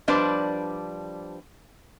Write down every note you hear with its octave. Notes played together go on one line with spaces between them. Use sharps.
F3 G3 D4 B4 C5 D5